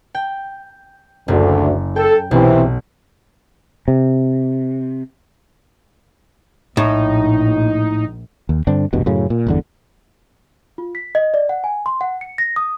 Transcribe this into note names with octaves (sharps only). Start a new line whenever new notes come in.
G5
F#1 D2
A4 G5
B1 C3 E3 C4
C3
A#1 A2 D#4
D#2
G2 D3 C4 D4
F1 C2 G2 B2
F#2 A2 C#3
A#2
G1 E2 D3
F4
B6
D#5
D5
F#5
G#5
C6
F#5
C#7
A#6
D#6